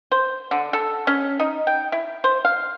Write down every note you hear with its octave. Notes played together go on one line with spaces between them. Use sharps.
C5
D3
A4
C#4
D#4
G5
E4
C5
F5